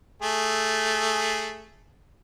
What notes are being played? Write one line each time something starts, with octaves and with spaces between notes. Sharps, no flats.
A3 G#4